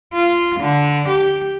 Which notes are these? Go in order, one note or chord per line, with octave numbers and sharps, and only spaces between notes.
F4
D3
G4